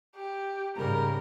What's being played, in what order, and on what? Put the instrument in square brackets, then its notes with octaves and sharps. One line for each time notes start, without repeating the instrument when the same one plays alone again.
[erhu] G4
[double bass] G#2 C#3 [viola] G3 A#4 [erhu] A#5